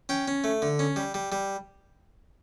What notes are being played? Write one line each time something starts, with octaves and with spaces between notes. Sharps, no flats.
C#4 G5
C#4
A3
D3
C#4
G3
G3
G3